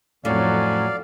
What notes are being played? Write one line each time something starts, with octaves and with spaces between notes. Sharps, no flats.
F2 A2 F#3 C#4 D5 F5